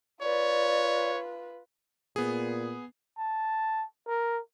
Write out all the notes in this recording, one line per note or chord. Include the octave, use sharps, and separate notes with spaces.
F4 B4 C#5 D5
A#2 B3 G#4
A5
A#4